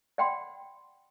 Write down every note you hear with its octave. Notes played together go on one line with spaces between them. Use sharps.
D5 F#5 G5 B5 C6